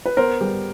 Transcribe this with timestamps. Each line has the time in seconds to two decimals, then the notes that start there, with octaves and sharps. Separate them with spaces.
0.06 B4
0.17 B3 A#4 C5
0.41 G3